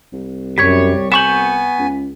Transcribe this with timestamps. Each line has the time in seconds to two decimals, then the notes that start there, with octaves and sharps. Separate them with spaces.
0.13 C2
0.58 F#2 G3 C#5 G#6 B6
1.12 B3 G#5 C#6 G6 E7 F#7
1.79 C#2